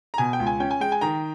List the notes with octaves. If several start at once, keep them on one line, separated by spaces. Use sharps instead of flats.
A#5
B2 G#5
G5
C#2
G#5
C#4 G5
G#5
G#3 G5
G#5
D#3 G5 A#5